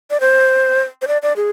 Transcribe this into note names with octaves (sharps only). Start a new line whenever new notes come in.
D5
C5
C5
D5
D5
G#4